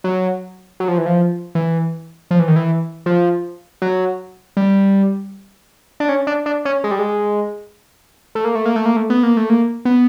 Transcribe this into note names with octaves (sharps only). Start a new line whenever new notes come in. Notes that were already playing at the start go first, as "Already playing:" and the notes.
F#3
F#3
F3
E3
F3
E3
F3
E3
D#3
E3
F3
F#3
G3
D4
C#4
D4
D4
C#4
G#3
G3
G#3
A3
A#3
A3
A#3
A3
A#3
A3
B3
A#3
A3
A#3
B3